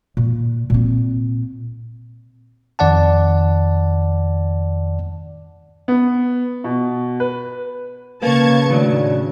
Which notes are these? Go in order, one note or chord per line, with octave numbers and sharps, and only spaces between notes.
A#2
A#2 C4
F2 D#3 D5 F#5 A5
B3
B2
B4
C#3 A#3 B4 A5 C#6 G#6
A2 D#3 F#3 D4